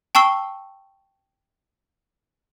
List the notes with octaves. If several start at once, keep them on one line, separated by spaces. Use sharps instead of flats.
G5 A5 C#6 E6 C7 G7